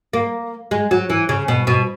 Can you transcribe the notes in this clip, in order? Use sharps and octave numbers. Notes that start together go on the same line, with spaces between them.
A#3
G#3
F#3
E3
C#3
B2
B2